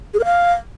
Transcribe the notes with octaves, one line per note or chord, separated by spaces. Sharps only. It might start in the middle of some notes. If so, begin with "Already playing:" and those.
G#4
A#4
F5